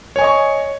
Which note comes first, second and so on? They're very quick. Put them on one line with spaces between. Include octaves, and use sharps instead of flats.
C#5 G#5 D#5 C#6